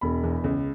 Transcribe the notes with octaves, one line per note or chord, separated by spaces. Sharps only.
E1 B5
E2
C#2